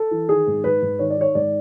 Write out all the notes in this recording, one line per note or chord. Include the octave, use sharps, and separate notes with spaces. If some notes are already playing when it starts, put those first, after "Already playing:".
Already playing: A4
E3
D#3 G#4
G#2
G#2 B4
G#2
D#3 C#5
D5
D#3 C#5
G#2 D5